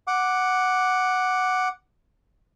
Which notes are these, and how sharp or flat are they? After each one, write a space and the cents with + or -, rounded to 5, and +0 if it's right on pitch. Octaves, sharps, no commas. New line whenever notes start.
F#5 +0 D6 +0